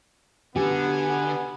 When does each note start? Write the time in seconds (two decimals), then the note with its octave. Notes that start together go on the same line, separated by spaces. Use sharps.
0.56 B2 D3 B3 G4 G#5